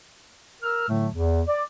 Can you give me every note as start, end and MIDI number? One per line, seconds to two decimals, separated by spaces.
0.63 0.84 70
0.63 0.84 88
0.63 0.84 89
0.89 1.08 45
0.89 1.08 50
0.89 1.08 54
0.89 1.08 57
1.14 1.41 40
1.48 1.63 74